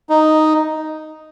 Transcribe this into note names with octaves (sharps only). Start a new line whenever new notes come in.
D#4